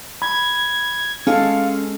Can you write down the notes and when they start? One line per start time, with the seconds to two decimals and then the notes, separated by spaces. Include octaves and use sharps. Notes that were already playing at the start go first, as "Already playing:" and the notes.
0.22 B5 G#6
1.27 G#3 C#4 A4 F5 C#6